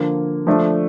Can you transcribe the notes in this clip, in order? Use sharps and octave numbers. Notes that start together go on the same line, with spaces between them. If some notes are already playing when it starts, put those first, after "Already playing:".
Already playing: D3 F3 A#3
F3 A3 D4